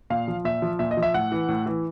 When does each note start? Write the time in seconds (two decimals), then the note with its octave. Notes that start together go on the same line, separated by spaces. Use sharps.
0.10 A#2 F5
0.28 F3
0.45 A#2 E5
0.62 F3
0.79 A#2 E5
0.91 D#5
0.97 F3
1.02 E5
1.14 A2 F#5
1.32 E3
1.48 A2
1.66 E3